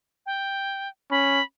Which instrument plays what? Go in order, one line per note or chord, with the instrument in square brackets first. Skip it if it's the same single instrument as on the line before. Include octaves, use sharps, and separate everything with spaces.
[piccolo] G5
[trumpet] C#4 [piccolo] B5